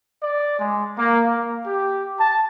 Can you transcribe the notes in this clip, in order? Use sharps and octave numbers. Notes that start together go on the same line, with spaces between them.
D5
G#3
A#3
A#3
G4
A5